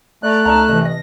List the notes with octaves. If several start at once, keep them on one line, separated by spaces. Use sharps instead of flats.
A3 D5 A#5 F#6
C#2 D#4 D5 A5 A#5 F6
C3 E3 D#5
D#5 A#6